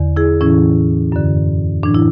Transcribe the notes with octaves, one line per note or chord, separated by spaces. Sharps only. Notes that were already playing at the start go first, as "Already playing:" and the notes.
Already playing: E2 D3
E4 G#4
A2 E3 C#4 E4
F#2 D3
A2 E3 D4
E4